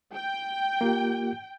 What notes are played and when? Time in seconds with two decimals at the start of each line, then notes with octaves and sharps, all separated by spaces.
0.15 G5
0.81 A#3 F4 G4